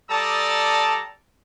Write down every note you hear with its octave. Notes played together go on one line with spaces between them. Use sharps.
G3 A4 D5 A5 A#5 D#6